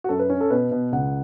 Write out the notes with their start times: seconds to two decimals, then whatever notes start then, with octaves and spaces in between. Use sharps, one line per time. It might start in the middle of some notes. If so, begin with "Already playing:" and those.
0.04 F#4
0.09 F#2 A4
0.19 B4
0.30 C#4
0.41 A4
0.50 B2 B4
0.71 B2
0.92 C#2 F#5